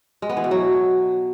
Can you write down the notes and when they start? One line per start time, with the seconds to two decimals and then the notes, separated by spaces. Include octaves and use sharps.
0.22 G#3
0.30 B3
0.37 E3
0.44 B2
0.51 F#3